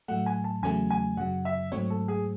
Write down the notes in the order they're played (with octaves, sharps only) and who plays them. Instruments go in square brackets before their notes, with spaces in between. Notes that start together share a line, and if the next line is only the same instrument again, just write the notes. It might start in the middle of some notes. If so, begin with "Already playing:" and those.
[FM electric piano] A2 F#3 A3 [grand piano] F#5
[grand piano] G#5
A5
[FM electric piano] E2 C#3 F#3 A3 C#4 [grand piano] G#5
[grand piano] G#5
[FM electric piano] F#2 C#3 F#3 [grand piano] F#5
[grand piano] E5
[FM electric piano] G#2 F#3 A3 C4 [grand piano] C#5
[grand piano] A4
G#4